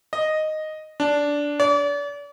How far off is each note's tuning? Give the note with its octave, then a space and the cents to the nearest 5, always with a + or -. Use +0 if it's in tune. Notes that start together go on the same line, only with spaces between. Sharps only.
D#5 -5
D4 -10
D5 -40